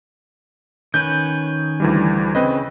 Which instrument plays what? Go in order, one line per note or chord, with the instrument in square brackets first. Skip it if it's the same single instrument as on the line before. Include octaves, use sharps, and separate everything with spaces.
[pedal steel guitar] D#3 C#4 B4 [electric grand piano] G6
[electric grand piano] D2 E3 G3
[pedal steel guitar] C#3 [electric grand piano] C4 B4 D#5